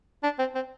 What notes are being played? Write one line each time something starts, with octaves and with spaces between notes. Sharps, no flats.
D4
C4
C4